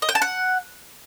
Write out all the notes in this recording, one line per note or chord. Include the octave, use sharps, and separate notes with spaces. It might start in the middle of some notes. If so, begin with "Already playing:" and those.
D#5
G5
A5
F#5